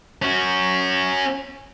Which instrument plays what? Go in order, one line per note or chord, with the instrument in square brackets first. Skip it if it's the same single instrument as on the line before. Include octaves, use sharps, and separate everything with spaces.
[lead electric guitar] C#4 F#4